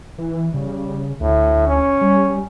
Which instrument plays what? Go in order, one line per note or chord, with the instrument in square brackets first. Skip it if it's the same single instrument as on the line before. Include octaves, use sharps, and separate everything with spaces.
[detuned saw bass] E3
[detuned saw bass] C#3 [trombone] G3
[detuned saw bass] D2 [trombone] A2
[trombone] C#4
[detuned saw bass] G3